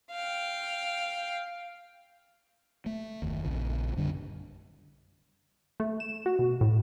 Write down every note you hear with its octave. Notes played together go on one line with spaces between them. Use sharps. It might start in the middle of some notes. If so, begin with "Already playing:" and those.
F5 G5
A3
F#1 D#2
A#1 C#3
F#2 D3 G3 D4
A3
E7
F#4
B2
A2